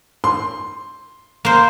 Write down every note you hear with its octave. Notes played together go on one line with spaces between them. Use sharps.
C6
A#3 C5